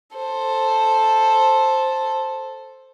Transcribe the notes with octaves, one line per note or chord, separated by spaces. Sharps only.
A4 C5